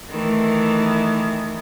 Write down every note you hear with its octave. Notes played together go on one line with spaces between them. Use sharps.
D#3 E3 A3